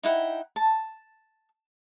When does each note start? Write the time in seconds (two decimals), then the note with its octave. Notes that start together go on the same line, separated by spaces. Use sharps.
0.03 D#4 E4 F#5 G5
0.56 A5